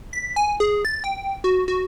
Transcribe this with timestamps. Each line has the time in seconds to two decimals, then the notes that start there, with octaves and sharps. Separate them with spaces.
0.13 B6
0.36 G#5
0.60 G#4
0.85 A6
1.04 G5
1.44 F#4
1.68 F#4